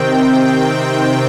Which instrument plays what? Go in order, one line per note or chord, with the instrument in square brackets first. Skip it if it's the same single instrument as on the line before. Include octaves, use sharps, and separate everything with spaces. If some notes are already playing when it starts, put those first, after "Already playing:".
Already playing: [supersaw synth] C3 D#3 C4 G5